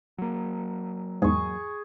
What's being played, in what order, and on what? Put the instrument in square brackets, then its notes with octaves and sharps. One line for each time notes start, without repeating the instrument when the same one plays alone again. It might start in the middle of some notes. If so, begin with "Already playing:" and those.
[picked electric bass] F#3 A#3
[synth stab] E2 G#2 [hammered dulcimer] G#4 C#6